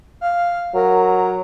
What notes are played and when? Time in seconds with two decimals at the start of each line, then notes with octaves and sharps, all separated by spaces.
0.21 F5
0.74 F#3 A#4